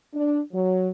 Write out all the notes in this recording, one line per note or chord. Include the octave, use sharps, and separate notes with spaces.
D4
F#3